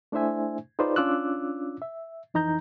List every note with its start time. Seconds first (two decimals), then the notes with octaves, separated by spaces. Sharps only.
0.12 A3 D4 E4 C5 E5 G#5
0.79 D#4 F4 G#4 B4 C5 D5
0.96 C#4 D4 F4 D6 E6 F#6
1.82 E5
2.34 F2 E3 D#4 A#5 G6